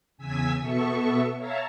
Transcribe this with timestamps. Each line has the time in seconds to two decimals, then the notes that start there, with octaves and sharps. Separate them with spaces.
0.17 E2 C#3 G#5 E6 G#6 B6
0.59 B2 B3 A4 E5 C#6
1.36 C#5 E5 F5 A5 A#5